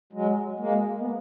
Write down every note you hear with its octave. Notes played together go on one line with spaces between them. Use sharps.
F#3 G#3
G#3 A#3
B3